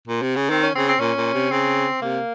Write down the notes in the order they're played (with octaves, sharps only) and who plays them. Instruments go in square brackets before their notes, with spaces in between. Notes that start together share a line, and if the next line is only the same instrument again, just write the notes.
[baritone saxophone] A#2
C3
C#3
[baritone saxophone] D#3 [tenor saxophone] C4
[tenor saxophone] C#4
[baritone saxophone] C#3 [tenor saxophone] C4
[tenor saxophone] C4
[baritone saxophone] A#2 [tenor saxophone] C#4
[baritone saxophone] A#2
C3
[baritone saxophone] C#3 [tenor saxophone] C4
[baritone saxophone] C3 [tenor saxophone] A#3